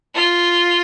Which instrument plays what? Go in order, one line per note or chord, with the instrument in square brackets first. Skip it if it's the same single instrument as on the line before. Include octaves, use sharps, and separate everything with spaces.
[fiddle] F4